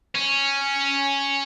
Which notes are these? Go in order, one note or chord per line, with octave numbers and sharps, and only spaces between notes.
C#4